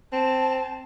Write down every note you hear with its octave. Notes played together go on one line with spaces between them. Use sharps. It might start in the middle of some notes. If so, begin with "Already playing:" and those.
C4 A5